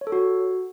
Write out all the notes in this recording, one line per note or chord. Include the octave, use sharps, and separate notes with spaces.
C#5
A4
F#4